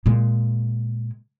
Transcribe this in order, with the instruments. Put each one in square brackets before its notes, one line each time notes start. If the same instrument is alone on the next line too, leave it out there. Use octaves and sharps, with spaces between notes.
[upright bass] A#2 G#3